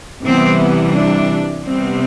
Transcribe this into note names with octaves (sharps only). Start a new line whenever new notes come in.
C3 E3 G3 B3 C4
B3
D4
C3 G3 B3 C4